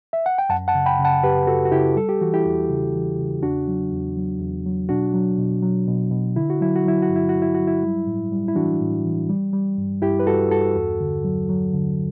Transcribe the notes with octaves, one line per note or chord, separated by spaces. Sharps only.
E5
F#5
G5
F#2 F#5 A5
F#5 A5
C#3
G5 B5
C#3
F#5 A5
F#2 G4 B4
F#2 F#4 A4
F#4
C#3 E4 G4
G3 A4
G4
E3 F#4
E4 G4
E2
C#3
E3
C#3
E2 D4 F#4
F#3
E2
F#3
E2
F#3
B2 D4 F#4
F#3
B2
F#3
B2
B2
D3 E4
F#4
F#3 E4
F#4
F#3 E4
F#4
G2
E4
F#4
G2
E4
F#3 F#4
E4
G3
A2
G3
E4
E3 D4 F#4
A2
E3
G3
G3
G2
G2 E4 G4
B4
G2 F#4 A4
G2 F#4 A4
E2
D3
F#3
F#3
D3